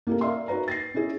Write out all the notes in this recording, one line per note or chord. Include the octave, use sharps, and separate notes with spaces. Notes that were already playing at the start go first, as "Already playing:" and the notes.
A#3 E4 G4 A4 A#4
A#4 D5 E5 F5 C6
D#4 F#4 B4 A#5
A6 A#6 C7
C#4 D#4 E4 G#4